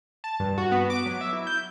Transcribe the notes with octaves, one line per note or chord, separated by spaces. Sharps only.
A5
G2
F#4
B3
D6
F#3
E5
E4
G6